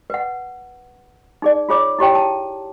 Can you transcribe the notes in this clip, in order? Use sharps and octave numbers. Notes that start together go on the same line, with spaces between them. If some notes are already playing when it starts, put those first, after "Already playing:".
B4 F#5
D#4 G#4 D5
F4 G#4 C#5 D6
E4 G4 C#5 G5
A5